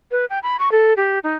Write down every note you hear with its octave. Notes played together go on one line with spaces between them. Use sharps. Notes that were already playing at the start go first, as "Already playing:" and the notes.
B4
G5
B5
C#6
A4
G4
D#4